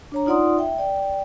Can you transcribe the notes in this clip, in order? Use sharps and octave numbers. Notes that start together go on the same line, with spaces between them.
D4 C#5 A#5
D#4 F4 D5 F#5 C6 D#6
E5 G5
D5 G5